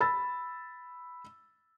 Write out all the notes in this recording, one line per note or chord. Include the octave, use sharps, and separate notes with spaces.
B5 E6 A6